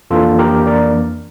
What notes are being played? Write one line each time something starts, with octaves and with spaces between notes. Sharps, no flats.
F2 E3 A#3 D4 F4 A4
G4 A#4
A#4 D5